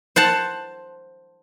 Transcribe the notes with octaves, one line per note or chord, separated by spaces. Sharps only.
C5 F#5 A5